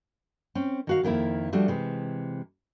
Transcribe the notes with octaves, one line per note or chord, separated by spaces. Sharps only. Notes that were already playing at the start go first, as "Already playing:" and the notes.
C4 C#4
D#3 F#4 F5
F2 D#3 A#3 E4
F3 G3 A3 D4 F#4
C3 E3 G#3